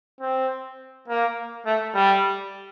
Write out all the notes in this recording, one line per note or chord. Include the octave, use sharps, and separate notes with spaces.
C4
A#3
A3
G3